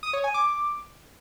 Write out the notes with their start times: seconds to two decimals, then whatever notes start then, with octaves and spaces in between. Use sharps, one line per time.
0.03 D#6
0.13 C#5
0.24 G#5
0.34 D6